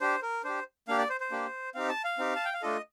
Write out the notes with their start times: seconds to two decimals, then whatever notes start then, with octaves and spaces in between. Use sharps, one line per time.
0.01 D4 G4 C5
0.22 A#4
0.44 D4 G4 C5
0.88 A#3 D4 G4 F5
0.99 D5
1.09 C5
1.21 C5
1.31 A#3 D4 G4
1.74 C4 D#4 G4 F5
1.89 A5
2.04 F5
2.18 C4 D#4 G4
2.36 A5
2.45 G5
2.53 F5
2.62 A3 D4 F4 A4 D#5